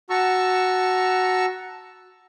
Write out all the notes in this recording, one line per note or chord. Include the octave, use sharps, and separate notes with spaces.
F#4 A5 A#5 C#6 E6